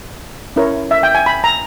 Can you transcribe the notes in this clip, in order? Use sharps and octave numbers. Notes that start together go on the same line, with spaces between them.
C#4 E4 A#4 C#5
E5
G5
G#5
B5
A#5